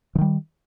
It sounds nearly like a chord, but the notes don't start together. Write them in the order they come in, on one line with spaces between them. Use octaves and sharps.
E3 D#3 G3